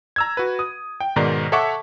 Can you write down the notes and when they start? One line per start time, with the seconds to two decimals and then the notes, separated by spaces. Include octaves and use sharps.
0.16 A#5 E6 G#6
0.37 F#4 B4
0.59 D#6
1.00 G5
1.16 G#2 B2 D#3 D5 A#5 G6
1.52 A4 C#5 E5 F#5 C#6 D6